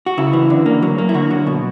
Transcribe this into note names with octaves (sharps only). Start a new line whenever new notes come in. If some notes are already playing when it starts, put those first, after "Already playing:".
F#4
C#3 E4
E3
D3
A#3
F#3
A#3
E4
D3 F#4
F#3
B2